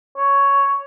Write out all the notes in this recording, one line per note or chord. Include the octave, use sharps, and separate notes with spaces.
C#5